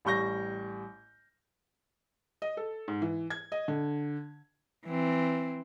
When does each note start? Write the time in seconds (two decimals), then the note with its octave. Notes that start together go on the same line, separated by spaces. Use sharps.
0.05 A1 G3 C#6 G6 A#6
2.42 D#5
2.57 A4
2.88 G#2
3.02 E3
3.30 G#6
3.52 D#5
3.68 D3
4.86 E3 C4